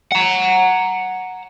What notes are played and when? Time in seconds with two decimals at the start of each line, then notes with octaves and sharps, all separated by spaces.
0.12 F#5 A#5